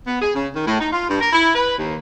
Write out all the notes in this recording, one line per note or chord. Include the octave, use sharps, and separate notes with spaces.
B3
G#4
C#3
D#3
A2
D#4
F4
G2
A#4
E4
B4
D#2